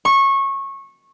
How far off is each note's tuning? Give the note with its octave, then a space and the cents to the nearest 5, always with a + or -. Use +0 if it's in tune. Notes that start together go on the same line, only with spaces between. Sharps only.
C#6 -20